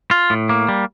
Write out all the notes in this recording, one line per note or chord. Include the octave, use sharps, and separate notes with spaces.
F4
A2
A#3
G3